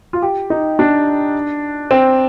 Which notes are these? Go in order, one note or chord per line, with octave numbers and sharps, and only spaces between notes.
F4
G4
D#4
D4
C4